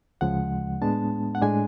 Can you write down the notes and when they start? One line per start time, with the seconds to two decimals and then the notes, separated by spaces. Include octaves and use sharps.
0.21 D2 C#3 F3 G#3 F#5
0.82 A2 G#3 B3 D4 A5
1.35 F#5
1.42 A2 G#3 D4 G#5